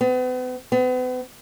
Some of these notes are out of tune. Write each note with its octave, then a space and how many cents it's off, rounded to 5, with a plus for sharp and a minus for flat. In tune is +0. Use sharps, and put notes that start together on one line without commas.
B3 +40
B3 +40